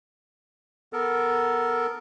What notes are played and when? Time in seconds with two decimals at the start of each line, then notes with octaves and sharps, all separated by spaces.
0.93 B3 A4 A#4